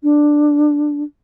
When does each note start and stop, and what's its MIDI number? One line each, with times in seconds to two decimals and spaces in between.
0.03 1.03 62